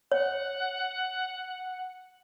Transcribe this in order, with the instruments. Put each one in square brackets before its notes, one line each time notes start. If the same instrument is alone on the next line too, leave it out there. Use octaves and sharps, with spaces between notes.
[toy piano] C#5 [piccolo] F#5